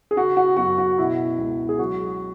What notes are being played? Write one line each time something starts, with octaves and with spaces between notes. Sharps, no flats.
G#4
C#3 F#4
F#4
F#2 F#4
F#4
B2 E4
C#2
G#4
F#3 F#4